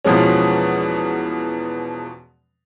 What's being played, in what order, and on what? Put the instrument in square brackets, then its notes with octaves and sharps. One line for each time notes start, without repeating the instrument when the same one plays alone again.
[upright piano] E2 B2 F3 G#3 C#4